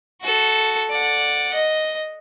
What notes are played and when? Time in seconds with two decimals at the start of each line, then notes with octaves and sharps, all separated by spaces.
0.22 F#4 A4
0.90 D5 F#5
1.54 D#5